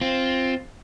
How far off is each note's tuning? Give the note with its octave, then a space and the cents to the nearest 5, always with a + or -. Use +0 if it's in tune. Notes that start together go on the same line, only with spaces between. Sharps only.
C4 +10 F4 +0